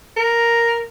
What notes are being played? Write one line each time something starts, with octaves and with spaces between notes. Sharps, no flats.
A#4